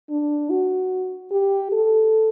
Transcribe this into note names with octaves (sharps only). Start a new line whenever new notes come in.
D4
F#4
G4
A4